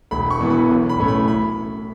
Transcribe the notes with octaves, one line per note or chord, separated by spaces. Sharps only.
E1 B5
C#6
E2 E3 B3
B5
B1
B5
A2 A3 C#4
B5
B5